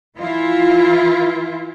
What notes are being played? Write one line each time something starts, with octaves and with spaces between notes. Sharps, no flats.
E3 E4 F4